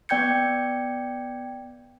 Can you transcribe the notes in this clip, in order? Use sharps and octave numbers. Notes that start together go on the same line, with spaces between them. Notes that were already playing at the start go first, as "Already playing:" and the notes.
B3 D5 G5 G6 G#6 C#7